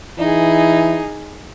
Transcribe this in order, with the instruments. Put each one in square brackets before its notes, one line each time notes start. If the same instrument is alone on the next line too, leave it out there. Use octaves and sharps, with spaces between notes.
[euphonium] E3 [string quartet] D#4 G#4